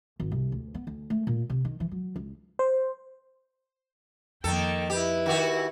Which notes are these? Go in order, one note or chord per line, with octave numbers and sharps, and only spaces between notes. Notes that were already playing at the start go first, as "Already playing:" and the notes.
G#1
C2
D2
B3
D2
A3
A#2
C3
D#3
E3
F#3
C#2
C5
F2 D#3 A#3 A4 G5
E4 G4 B4
D#3 F#4 G4